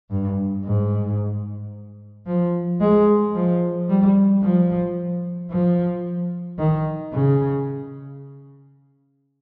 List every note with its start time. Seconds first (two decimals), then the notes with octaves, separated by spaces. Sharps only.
0.10 G2
0.64 G#2
2.26 F3
2.81 G#3
3.34 F3
3.89 G3
4.43 F3
5.51 F3
6.58 D#3
7.13 C#3